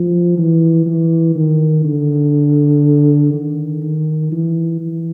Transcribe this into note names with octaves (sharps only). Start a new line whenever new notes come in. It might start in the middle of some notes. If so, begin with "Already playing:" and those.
Already playing: F3
E3
E3
D#3
D3
D#3
D#3
E3
E3